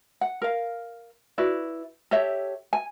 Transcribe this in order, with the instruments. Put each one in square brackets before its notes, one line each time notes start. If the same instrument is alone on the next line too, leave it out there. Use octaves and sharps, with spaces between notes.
[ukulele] F#5
A#4 F5
E4 F#4 B4 D5
G4 A4 C#5 E5
G#5